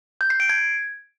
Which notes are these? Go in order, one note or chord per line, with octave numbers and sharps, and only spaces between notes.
G6
C7
D7
G#6